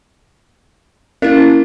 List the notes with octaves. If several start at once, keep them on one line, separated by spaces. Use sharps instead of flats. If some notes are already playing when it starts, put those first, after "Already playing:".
A#3 C#4 E4